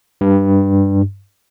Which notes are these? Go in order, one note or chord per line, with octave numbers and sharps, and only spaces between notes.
G2